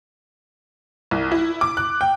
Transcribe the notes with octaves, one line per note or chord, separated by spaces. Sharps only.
C2
E4
D6
F#6
G5